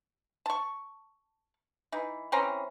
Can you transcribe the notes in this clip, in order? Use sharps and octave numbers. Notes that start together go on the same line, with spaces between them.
A5 C#6
E3 D#4
E3 C4 C#4 A#5